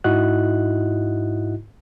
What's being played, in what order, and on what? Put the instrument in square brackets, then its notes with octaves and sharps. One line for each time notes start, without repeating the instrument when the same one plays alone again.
[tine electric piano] G#2 D#4 E4 F#4 D#5 F#6